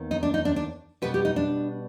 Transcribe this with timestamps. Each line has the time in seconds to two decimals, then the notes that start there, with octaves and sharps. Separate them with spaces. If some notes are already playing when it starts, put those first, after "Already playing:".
Already playing: D#2 D#3 B3
0.11 D#4
0.23 D4
0.34 D#4
0.45 D4
0.56 D4
1.02 B2 G3 B3 B4
1.14 G4
1.25 D#4
1.36 D4